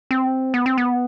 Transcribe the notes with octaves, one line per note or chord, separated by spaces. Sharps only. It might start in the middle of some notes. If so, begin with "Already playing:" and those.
C4
B3
C4
B3